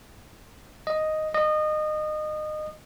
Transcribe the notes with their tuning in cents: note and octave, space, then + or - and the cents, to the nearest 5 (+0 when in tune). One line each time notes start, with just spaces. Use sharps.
D#5 +0
D#5 -25